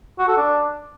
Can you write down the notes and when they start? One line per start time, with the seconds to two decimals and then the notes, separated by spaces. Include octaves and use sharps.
0.18 F#4
0.28 A4
0.37 D4